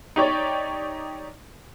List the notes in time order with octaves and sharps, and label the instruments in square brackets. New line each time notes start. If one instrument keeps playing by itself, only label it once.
[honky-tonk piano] D#4 G4 C#5 D5